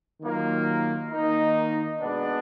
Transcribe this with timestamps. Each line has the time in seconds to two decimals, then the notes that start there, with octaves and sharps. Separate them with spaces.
0.21 D#3 F#3 A#3 F4
1.10 D#3 A#3 D#4
1.99 B2 G#3 B3 D4